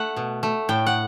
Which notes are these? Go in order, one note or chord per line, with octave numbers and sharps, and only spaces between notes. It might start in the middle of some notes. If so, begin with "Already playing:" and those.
Already playing: A3 F#5
B2
A3
A2 G5
F#5